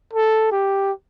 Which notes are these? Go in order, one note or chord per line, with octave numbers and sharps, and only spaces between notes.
A4
G4